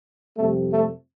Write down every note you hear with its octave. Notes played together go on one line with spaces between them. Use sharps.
F2 C3 G3 A3
A3